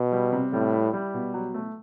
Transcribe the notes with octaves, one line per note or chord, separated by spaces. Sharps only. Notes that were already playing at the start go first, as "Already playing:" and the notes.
Already playing: B2
G3
C3
A2 G3
E4
G3
B2
F#3
A3